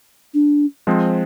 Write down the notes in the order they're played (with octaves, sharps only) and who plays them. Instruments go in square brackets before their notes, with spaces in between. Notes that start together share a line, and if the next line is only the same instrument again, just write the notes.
[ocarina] D4
[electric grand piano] F3 G#3 C4